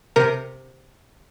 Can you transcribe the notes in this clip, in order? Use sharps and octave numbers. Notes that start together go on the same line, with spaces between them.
C3 A#4